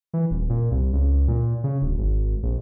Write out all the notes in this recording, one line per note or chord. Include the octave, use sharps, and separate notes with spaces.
E3
D#1
A#2
C2
C#2
C#2
A#2
C#3
D1
G#1
A#1